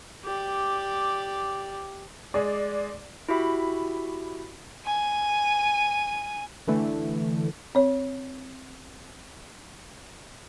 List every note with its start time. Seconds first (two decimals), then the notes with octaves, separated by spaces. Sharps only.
0.24 G4 D5
2.34 G#3 G#4 D5
3.29 E4 F#4 G4 E5 B5
4.86 G#5 D#7
6.68 D3 E3 A3
7.75 C4 C#5